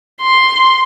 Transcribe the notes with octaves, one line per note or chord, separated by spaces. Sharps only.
C6